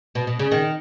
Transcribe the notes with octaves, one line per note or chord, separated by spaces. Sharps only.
B2
B2
C#3
D#3